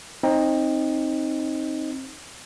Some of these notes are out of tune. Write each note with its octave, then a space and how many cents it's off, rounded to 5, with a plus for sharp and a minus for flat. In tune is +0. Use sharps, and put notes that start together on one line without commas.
C4 +25 D#4 +0